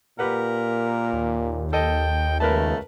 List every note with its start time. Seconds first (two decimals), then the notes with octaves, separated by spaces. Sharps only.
0.19 A#2 G4 A#4 B4 F#5
1.13 D#2
1.73 A4 D#5 G5
2.40 C#2 A3 A#4 B4 A5